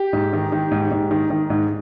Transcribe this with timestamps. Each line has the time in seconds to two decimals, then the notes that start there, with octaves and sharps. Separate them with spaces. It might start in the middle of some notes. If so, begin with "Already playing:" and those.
Already playing: G4
0.13 G#2
0.33 D#3
0.52 D#3
0.71 G#2
0.91 G#2
1.11 D#3
1.30 D#3
1.50 G#2